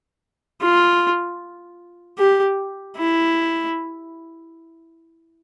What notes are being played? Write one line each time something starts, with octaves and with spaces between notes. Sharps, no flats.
F4
G4
E4